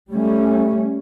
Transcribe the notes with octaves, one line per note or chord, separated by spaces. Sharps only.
G3 A3 C#4